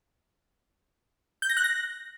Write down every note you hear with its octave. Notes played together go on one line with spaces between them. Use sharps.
G6
A#6
F#6
A#6